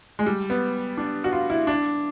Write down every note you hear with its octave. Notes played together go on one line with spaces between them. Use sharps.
G#3
G3
B3
D4
F#4
F4
E4
D4